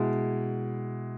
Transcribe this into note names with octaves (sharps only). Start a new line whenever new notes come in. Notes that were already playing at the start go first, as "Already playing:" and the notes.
Already playing: B2 G#3 E4